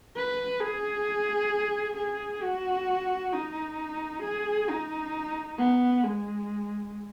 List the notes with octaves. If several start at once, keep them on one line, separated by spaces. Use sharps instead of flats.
B4
G#4
G#4
F#4
D#4
G#4
D#4
B3
G#3